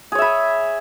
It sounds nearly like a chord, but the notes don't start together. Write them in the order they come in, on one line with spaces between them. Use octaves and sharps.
G#4 C#5 E5 B5